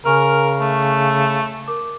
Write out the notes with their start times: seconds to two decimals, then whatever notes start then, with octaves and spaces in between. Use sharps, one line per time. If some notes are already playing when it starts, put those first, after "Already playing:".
0.05 C#3 A#4 G#5 C#6 F6
0.60 A3
1.68 A#4 D6